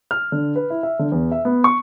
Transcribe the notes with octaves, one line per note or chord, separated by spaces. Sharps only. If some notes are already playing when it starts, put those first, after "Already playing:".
F6
D3
B4
E4
E5
D3
E2
E5
B3
C#6